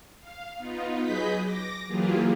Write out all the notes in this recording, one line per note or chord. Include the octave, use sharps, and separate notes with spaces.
F5
B3 D#4 F4
F#3 G#4 B4 D#5 G6 B6
D6 A#6
E3 F#3 A#3 F4 G4 G#4